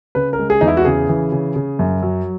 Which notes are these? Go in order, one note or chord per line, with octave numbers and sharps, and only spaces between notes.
C#3 B4
A#4
G#3
G#4
E2 D#4
E4
F#4
C#3 G#4
E3
C#3
C#3
F#2
F#3